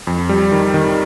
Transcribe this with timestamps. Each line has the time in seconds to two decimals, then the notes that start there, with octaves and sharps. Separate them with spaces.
0.07 F2
0.29 G3
0.52 D#3
0.74 D#3